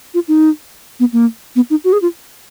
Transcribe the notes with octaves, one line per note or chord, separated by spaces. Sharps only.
F4
D#4
B3
A#3
B3
D#4
F#4
G#4
F4